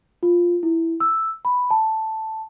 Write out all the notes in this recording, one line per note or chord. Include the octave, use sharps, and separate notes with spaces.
F4
E4
E6
B5
A5